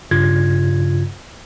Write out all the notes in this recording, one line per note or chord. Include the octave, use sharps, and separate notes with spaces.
G2 C#3 F4 G#6